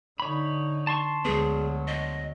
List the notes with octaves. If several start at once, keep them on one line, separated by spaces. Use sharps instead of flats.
D3 D#4 C#5 B5
A5 C6 C#6
D2 F#3 G#3 B3 G#4
D#5